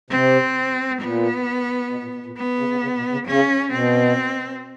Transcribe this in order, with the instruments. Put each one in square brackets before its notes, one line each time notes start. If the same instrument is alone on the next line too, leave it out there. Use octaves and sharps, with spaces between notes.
[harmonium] C3 [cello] C4
[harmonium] A#2 [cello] B3
[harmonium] B2
A#2
B2
A#2
[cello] B3
[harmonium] C#3
C#3
C#3
B2
C#3
[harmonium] C#3 [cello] C#4
[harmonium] B2 [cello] C4